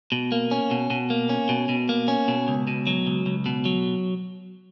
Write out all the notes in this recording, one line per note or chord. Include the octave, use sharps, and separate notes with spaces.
B2
A#3
C#4
B2
B2
A#3
C#4
B2
B2
A#3
C#4
B2
C#2
B2
F#3
C#2
C#2
B2
F#3